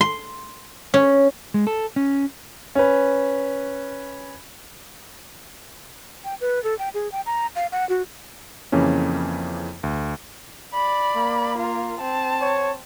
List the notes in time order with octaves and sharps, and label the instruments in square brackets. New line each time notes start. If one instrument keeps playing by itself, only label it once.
[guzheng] C6
C#4
[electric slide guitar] G#3
A4
C#4
[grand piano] C#4 B4
[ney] G5
B4
A4
G5
G#4
G5
A#5
F5
F#5
F#4
[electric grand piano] F2 C#3 E3 A#3 C#4
D2
[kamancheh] D5 B5
[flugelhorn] A#3
[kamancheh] F4 A#4
C4 A5
[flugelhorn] C#5